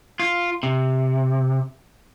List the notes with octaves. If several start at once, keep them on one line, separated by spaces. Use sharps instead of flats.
F4
C3